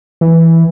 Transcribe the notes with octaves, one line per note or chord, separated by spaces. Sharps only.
E3